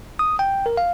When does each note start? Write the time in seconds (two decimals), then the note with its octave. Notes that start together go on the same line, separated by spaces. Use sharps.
0.19 D#6
0.39 G5
0.66 A#4
0.77 F5